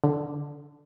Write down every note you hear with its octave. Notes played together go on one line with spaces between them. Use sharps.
D3